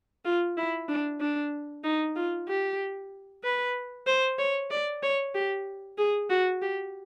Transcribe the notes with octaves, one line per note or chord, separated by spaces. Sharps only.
F4
E4
D4
D4
D#4
F4
G4
B4
C5
C#5
D5
C#5
G4
G#4
F#4
G4